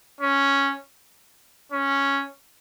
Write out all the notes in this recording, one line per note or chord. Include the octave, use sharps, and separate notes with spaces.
C#4
C#4